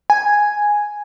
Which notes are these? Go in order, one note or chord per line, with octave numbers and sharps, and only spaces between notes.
G#5